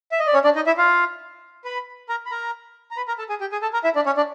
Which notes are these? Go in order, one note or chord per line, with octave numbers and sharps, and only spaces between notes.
E5
D#5
D5
C#4 C#5
D4 D5
D#4 D#5
E4 E5
F4 F5
B4 B5
A#4 A#5
B5
A#4 A#5
A#5
B4 B5
A#4 A#5
A4 A5
G#4 G#5
G4 G5
G#4 G#5
A4 A5
A#4 A#5
E4 E5
D4 D5
C#4 C#5
D4 D5